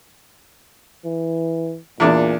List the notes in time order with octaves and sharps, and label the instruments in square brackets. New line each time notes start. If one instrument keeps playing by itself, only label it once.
[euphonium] E3
[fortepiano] E2 D4 [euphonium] A#2